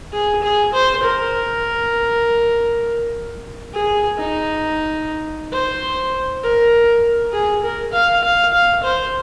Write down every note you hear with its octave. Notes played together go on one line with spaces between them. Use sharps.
G#4
G#4
C5
A#4
G#4
D#4
C5
A#4
G#4
A#4
F5
F5
F5
C5